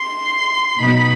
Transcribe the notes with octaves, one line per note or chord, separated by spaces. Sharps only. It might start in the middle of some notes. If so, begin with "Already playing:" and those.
Already playing: C6
B2 F#3 B3 D#4 B5